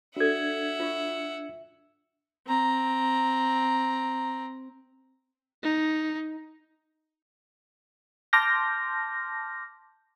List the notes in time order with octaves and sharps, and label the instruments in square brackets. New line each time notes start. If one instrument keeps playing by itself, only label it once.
[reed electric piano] D4 G#6 [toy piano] F#4 A4 [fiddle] E5 F#5
[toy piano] F4 C#6
[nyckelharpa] C4 A#5
[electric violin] D#4
[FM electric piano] A5 C6 D6 F6 G6 A#6